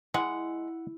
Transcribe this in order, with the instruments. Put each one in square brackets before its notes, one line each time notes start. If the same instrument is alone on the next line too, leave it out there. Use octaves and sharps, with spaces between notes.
[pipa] G#3 [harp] E4 [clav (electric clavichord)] F#5